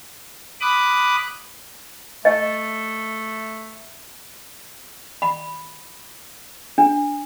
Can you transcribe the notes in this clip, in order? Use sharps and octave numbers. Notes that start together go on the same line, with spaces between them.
B5 D6 D#6 F#6
A3 D#5
B5
D4